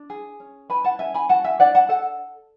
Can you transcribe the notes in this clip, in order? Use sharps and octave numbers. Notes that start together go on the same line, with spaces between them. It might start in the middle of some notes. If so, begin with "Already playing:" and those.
Already playing: D4
G#4
C#4
B4 G#5 B5
F#5 A5
C#4 E5 G#5
G#5 B5
F#4 F#5 A5
E5 G#5
D4 D5 F#5
F#5 A5
A4 F#5 A5